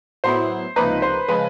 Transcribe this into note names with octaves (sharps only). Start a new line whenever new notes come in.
A2 F#3 B3 E4 C5
C#2 C3 F3 A#3 D#4 B4
C5
C#3 F3 G#3 B4